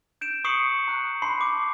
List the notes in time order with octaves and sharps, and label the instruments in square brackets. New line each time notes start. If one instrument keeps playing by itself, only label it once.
[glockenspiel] G6 D7 E7
C#6 D#6 C7 C#7 F#7
A#5 F#6
A5 B5 C6 C7
D6